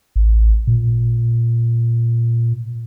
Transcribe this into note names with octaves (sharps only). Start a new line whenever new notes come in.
A1
A#2